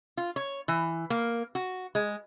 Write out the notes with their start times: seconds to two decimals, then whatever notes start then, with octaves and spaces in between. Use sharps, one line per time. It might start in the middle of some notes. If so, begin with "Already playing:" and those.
0.17 F4
0.36 C#5
0.68 E3
1.10 A#3
1.55 F#4
1.95 G#3